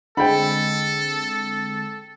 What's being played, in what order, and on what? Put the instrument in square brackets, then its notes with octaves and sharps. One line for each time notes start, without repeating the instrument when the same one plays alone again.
[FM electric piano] D3 G#3 C4 [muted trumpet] A4 [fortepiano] G5 B5